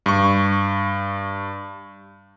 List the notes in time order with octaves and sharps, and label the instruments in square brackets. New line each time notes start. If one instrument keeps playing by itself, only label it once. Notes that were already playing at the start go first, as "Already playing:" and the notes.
[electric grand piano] G2 C#6